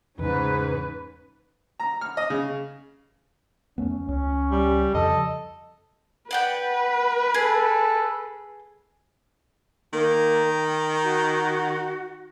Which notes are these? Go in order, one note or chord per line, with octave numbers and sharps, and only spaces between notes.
E2 G#2 C#3 C#4 B4
A#5
F6
D#5
C#3
E2 A3 B3 C#4
C#2 C#4
G3
F2 C#3 F3 A4 D#5
B4 D5 F#5 G5
G#4 A4
D#3 A#3
G5
F#4